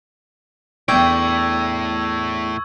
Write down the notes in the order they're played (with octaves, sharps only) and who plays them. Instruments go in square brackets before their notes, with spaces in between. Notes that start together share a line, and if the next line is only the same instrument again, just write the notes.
[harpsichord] E2 D4 [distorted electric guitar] A2 A3 [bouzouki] G5 [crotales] C#6 E6 G#6